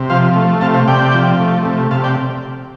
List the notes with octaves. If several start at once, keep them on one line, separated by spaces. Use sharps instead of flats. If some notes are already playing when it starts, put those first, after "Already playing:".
Already playing: C3
F3 C5 F5
A3
C3 F5 A5
C5 F5
C3 D5 G5
F3
A3
C3
C3 F5 A5
D5 G5